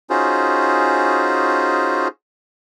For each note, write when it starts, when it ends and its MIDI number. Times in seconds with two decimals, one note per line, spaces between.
0.10 2.08 61
0.10 2.08 63
0.10 2.08 65
0.10 2.08 66
0.10 2.08 68
0.10 2.08 72